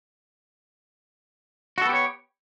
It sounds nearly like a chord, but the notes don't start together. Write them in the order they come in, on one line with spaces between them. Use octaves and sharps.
F#4 A4 B3 G4 C#5